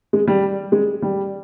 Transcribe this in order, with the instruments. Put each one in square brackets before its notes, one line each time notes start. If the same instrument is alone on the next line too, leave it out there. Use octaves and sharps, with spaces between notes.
[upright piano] G#3
G3
G#3
G3